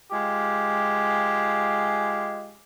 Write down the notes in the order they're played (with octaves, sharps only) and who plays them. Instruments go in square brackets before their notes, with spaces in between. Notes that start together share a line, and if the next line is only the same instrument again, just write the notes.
[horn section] G#3 F4 G4